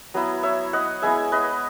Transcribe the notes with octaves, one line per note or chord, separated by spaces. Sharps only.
F#3 B3 E4
C#5 E5
D#5 F#5
G#3 B3 E4 E5 G#5
B4 D#5